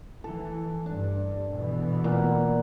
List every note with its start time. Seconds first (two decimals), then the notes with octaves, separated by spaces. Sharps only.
0.24 E3 A4
0.86 G2 D4
1.55 B2 E3 B3
2.04 A#2 F#5